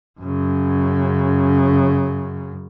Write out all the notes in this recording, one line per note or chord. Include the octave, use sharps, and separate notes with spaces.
F#2 C#3